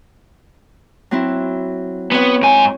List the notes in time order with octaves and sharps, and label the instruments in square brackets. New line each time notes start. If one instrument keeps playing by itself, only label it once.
[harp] F#3 C4 E4
[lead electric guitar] B3 [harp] C4 C#5
[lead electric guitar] G#2 G#5